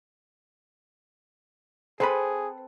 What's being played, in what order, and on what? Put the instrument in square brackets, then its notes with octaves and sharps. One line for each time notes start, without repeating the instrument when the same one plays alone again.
[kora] C4 A4 B4 [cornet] G#4 [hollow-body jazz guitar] C5 B5